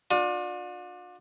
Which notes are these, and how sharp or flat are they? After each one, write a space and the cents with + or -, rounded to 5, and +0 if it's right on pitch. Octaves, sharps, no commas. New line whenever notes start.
D4 +15 F4 +45